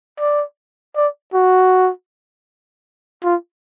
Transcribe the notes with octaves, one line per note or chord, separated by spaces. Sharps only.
D5
D5
F#4
F4